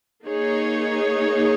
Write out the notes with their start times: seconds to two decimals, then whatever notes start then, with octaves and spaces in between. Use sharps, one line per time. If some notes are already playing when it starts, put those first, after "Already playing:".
0.24 A#3 D#4 G#4 C#5